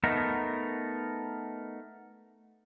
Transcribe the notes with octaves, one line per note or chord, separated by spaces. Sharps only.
A3 B3 D#4 A#4